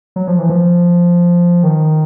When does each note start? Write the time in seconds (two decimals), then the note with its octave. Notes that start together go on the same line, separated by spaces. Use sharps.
0.16 F#3
0.27 F3
0.39 E3
0.49 F3
1.63 D#3